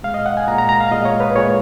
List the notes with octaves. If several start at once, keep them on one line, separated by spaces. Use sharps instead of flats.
A#2 G#3 F5
D#5
F#5
G#5
A#2 G#3 A#5
A#5
A#5
F5
A#2 G#3 D#5
C#5
B4
A#2 G#3 C#5